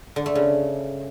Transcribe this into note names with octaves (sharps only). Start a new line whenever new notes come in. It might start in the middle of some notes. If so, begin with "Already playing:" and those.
D3
A3
C#3